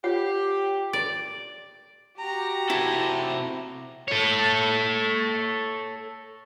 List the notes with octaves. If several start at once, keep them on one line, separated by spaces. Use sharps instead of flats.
F4 G4 C#5 F#5
D5
F#4 G4 A#5
C3 E4 A4
A4 C#5